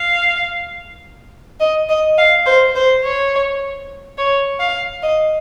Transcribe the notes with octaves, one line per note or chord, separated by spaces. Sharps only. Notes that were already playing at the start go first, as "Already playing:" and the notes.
Already playing: F5
D#5
D#5
F5
C5
C5
C#5
C#5
F5
D#5